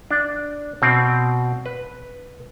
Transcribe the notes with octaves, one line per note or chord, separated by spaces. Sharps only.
D4
B2 C4
B4